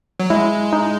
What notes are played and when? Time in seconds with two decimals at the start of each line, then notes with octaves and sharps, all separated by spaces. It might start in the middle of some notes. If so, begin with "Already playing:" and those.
0.20 F#3
0.30 G#3 E4
0.73 D#4